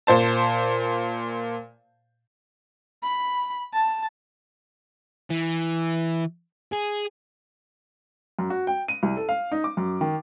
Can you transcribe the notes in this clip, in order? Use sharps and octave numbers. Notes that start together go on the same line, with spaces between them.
A#2 C5 A5
B5
A5
E3
G#4
F#2
F#4
G5
D#7
C2
A4
F5
D#4
D6
F#2
D#3